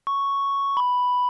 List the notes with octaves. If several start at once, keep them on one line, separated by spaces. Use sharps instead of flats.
C#6
B5